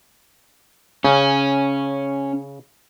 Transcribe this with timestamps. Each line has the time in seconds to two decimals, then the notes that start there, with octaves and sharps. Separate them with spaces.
1.05 C#3 C#4